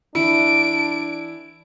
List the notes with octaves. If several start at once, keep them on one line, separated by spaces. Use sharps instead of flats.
E3 D4 E4 D7